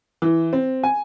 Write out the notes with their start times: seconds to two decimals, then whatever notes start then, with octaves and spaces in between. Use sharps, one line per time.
0.22 E3
0.53 C4
0.83 G#5